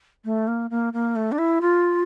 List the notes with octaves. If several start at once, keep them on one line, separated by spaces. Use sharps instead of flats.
A3
A#3
A#3
A#3
A3
D4
E4
F4